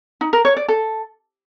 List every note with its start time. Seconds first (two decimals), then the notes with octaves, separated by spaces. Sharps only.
0.21 D#4
0.33 A#4
0.45 C#5
0.57 D5
0.68 A4